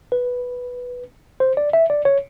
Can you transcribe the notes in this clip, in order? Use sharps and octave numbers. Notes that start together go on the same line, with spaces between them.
B4
C5
D5
E5
D5
C#5